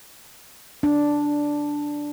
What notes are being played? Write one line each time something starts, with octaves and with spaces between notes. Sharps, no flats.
D4